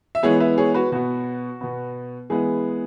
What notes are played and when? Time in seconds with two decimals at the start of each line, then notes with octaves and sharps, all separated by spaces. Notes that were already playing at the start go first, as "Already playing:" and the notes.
0.15 E5
0.23 E3 G#3 B3 G#4 C#5
0.40 B4 E5
0.58 G#4 C#5
0.74 F#4 B4
0.92 B2 B3 F#4
1.61 B2 B3
2.30 E3 G#3 B3 G#4